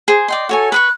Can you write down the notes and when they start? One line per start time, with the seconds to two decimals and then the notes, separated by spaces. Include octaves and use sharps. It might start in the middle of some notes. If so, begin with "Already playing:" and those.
0.08 G#4 C5
0.28 D5 D#5 G5 C6
0.49 F#4 A4 C#5 G#5
0.72 B4 B5 C#6 F#6